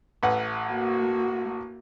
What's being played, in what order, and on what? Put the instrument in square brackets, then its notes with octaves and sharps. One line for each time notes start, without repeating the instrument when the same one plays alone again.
[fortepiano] A1 B4 F#5
[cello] A#3 F#4